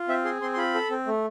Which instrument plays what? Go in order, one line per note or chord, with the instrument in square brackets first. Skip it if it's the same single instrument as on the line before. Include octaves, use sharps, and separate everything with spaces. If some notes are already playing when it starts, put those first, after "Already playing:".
Already playing: [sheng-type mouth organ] F4
C4 E5
G#4 C6
C4 C6
C6
F4 B5
A4
C4
A3